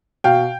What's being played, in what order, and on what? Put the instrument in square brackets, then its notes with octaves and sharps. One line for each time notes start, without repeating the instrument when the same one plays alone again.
[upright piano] B2 F5 G5